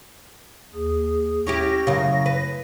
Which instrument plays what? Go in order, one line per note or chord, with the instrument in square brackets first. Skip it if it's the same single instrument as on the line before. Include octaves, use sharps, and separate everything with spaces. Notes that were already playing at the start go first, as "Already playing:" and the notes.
[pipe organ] D#2 G#4
[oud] C#4 E4 G4 [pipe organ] A#6
[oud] F#2 C#3
B4